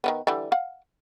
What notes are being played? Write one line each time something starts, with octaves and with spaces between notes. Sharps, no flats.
D#3 E3 B3
D3 E3 G3
F5 F#5